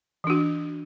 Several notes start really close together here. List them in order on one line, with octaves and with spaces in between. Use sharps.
E3 D4 F#4